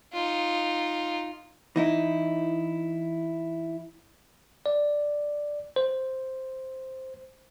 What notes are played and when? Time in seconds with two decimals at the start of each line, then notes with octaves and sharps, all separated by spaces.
0.13 D#4 F4
1.76 E3 D#4 E4
4.66 D5
5.76 C5